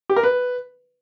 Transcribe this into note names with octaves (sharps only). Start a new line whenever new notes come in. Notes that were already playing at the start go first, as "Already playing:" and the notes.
G4
A#4
B4